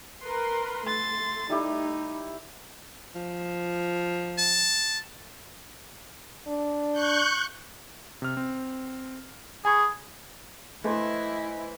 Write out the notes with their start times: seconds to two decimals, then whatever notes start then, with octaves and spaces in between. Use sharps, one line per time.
0.21 A#4 B4 C6
0.86 A3 C6 A6
1.49 G3 D#4 E4 G4
3.15 F3
4.38 A5
6.47 D4
6.93 C#6 F#6 G6
8.22 C3 F6
8.37 C4
9.65 G#4 G#5 B5 C#6
10.84 E3 A3 E4 C5 D#5